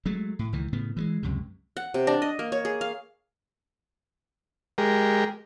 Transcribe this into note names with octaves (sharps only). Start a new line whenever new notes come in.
F#3 G#3 A3
A2
C#2 D#3 E3
A2 C#3 B3
E3 F3 G#3
C#2 F#2 C3
F#5
C3
D4
D#5
A#3
C#5
G#4
F5
G#3 G4 A#4